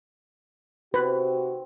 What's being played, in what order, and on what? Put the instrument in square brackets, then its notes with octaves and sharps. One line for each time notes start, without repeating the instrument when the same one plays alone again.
[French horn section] C3 F#4 [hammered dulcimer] D#3 C4 [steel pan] B4